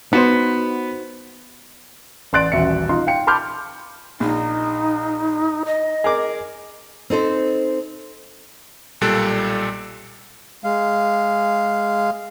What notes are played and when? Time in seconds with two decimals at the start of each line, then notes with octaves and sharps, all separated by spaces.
0.13 B3 D#4 F#4 C5
2.33 A1 D5 C6 F#6 A6 D7
2.52 D#1 A1 F#4 E5 C#7
2.89 D#4 F4 C6
3.07 F5 G5 C#7
3.27 A5 B5 C6 D6 F6 G6
4.20 A#1 D#4
5.66 D#5
6.04 G#4 A#4 D6
7.10 C4 D#4 A4 C5
9.01 B1 A#2 G3 A4 F#6 D7
10.64 G#3 F5